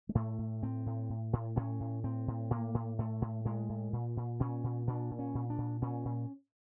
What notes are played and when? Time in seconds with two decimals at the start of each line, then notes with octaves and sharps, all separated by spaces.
0.09 G#3
0.15 A2 A3
0.39 A2
0.62 A2 C4
0.86 A2
1.10 A2
1.33 A2
1.56 A2 C#4
1.80 A2
2.04 A2 C4
2.28 A2
2.51 A2 A#3
2.74 A2
2.99 A2 A3
3.22 A2
3.45 A2 G#3
3.69 A2
3.93 A#2
4.17 A#2
4.40 A#2 C#4
4.64 A#2
4.87 A#2 D4
5.11 A#2
5.19 C#4
5.35 A#2
5.50 D4
5.58 A#2
5.82 A#2 C#4
6.05 A#2